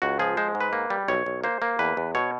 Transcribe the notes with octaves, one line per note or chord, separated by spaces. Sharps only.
C#2 F#4
F3 G#4
G#3 C5
G#2
B4
A#3
G3
B1 C#5
B1
A#3 C5
A#3
E2 B4
E2
B2 C#5